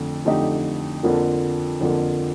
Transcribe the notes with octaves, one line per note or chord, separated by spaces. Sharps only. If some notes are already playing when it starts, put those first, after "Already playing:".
Already playing: F2 D3 A3
F2 D3 A3 D#4 G4
F2 D3 F3 A#3
F2 D3 F3 A#3